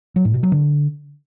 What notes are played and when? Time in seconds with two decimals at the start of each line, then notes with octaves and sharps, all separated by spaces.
0.16 F#3
0.25 A2
0.34 B2
0.43 F#3
0.52 D3